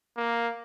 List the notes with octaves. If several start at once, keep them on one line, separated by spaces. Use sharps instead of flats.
A#3